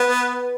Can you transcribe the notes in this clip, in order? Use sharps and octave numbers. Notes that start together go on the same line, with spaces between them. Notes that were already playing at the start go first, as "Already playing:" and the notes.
Already playing: B3 B4